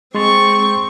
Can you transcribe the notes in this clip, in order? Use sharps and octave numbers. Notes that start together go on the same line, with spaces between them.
G#3 C4 C6 C#6 A6